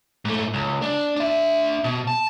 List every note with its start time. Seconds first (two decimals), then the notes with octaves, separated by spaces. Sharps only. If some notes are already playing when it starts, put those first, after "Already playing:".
0.25 G#2 A3
0.54 C#2
0.82 D4
1.16 D4 E5
1.84 B2
2.08 A5